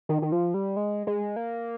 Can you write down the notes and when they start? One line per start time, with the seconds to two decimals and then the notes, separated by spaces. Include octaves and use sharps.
0.09 D#3
0.22 D#3
0.32 F3
0.54 G3
0.77 G#3
1.07 G#3
1.36 A#3